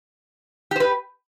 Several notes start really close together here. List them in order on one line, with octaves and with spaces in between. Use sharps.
G4 C5 B4